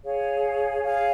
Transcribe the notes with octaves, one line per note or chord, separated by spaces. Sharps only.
G#4 C#5 F5
G#4 C#5 F5